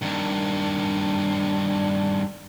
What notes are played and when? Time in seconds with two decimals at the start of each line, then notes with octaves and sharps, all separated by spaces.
0.02 G2 D#3